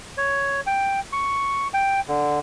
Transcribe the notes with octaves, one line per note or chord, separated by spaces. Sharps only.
C#5
G5
C#6
G5
D3